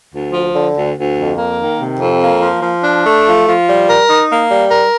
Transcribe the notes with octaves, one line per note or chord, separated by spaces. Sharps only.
D2
F3
D3
D2
D2
F2
A#3
D#3
C3
F2
A#3
F3
F3
D4
A3
F3
F3
G3
A#4
D#4
A#3
G3
A#4